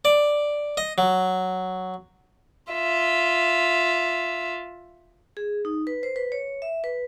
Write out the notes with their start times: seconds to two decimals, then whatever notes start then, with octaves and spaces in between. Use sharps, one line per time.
0.05 D5
0.77 D#5
0.98 F#3
2.72 F4 E5
5.37 G#4
5.65 D#4
5.87 B4
6.03 C5
6.16 B4
6.32 C#5
6.62 E5
6.84 B4